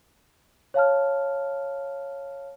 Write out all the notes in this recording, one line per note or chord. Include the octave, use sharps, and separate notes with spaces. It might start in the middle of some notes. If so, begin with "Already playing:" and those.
C#5 F5 A5 F6